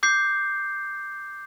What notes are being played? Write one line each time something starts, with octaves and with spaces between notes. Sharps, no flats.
D6 G6 C7